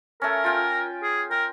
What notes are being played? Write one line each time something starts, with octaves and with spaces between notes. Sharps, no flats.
A3 C#4 A#4
F4 G5 G#5
G#4
A#4 G5